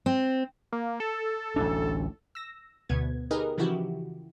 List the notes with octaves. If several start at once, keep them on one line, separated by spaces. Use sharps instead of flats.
C4
A#3
A4
A1 D2 D4
E6 A#6
D2 B2 B3 G#6
D#4 G4 G#4 A#4 B4 D#5
C#3 E3 F3 E4 F#4 G4